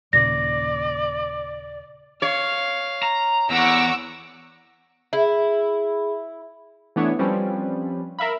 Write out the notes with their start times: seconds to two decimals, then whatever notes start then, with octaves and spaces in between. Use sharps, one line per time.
0.13 D#2 A#2 C#3 D5 A#6
2.22 C#5 F5
3.03 A#5
3.50 E2 F#5 A#5 C#6 D6 E6
5.13 E4 G#4
6.96 E3 A3 B3 D4 E4 C#5
7.19 F3 G3 C4 C#4 B4
8.19 A#4 E5 F5 B5